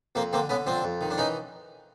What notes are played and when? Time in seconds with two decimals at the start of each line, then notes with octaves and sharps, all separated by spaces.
0.15 F2 A#3 C4
0.33 D3 A#3 C4
0.49 D3 B3 C#4
0.67 F2 C4 D4
0.84 F2
1.01 D#3
1.11 D4
1.18 E3 C#4 D#4